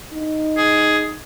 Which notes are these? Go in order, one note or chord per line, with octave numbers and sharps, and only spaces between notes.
D#4
G#4